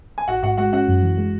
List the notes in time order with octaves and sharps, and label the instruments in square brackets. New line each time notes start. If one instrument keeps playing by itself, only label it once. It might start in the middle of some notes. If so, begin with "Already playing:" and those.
[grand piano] G#5
[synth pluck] A1 [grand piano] F#4 F#5
[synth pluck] G#2 [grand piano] F#4 F#5
[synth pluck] G#3 [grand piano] F#4 F#5
[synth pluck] C#4 [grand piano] F#4 F#5
[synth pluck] F#2
E3
G#3